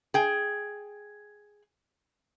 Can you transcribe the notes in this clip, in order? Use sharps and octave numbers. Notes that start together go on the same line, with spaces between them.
G#4 G5